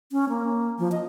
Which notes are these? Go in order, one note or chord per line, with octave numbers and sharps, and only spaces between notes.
C#4
A#3
F3
D#5